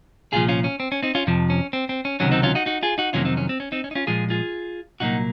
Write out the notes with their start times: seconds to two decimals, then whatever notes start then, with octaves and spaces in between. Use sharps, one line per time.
0.33 C2 A#2 F3 F4 G#4
0.48 C#4 F4
0.64 C#4
0.80 C4
0.92 C#4
1.03 C4 D#4
1.15 C#4 F4
1.27 F2 C3 F3
1.50 C#4
1.73 C4
1.89 C4
2.05 C#4
2.20 C#2 C3 D#3 F#3 C#4
2.32 C4 D#4
2.43 C#4 F4
2.55 D#4 F#4
2.66 D#4 F#4
2.83 F4 G#4
2.98 D#4 F#4
3.13 F2 C3 D#3 F#3 A#3 C#4 F4
3.25 C4 D#4
3.37 C#4
3.49 C4
3.60 C#4
3.72 C4 D#4
3.84 C#4
3.91 D#4
3.95 C#4 F4
4.07 A#2 F3 G#3 F4 G#4
4.30 F4 G#4
5.00 C2 A#2 F#3 A#3 D#4 F#4